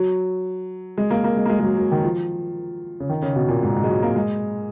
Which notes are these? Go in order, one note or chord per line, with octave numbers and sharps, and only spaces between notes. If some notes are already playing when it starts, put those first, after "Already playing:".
Already playing: F#3
G#3
A#3
A#3
G#3
A#3
G#3
G#3
F#3
F#3
D#3
F3
C#3
D#3
C#3
B2
A#2
G#2
G#2
G#3
F#3
A#3
G#3